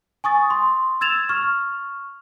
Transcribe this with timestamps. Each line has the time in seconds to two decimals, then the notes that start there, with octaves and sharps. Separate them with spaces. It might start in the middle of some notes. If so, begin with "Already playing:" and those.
0.24 G#5 C#6 D#6 A6
0.50 C6
1.01 E6 G#6 A6 E7 F7
1.29 C#6 F6